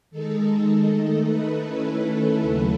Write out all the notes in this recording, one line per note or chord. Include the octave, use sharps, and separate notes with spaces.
D#3 G#3 D#4 A4
A4
D#3 A3 D#4
B4
D#3 A3 C#4 E4
A4
D#2 C#3 F#3 A3 B4